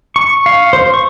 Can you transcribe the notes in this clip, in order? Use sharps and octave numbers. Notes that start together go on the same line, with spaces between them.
C#6
F5
C5
C#6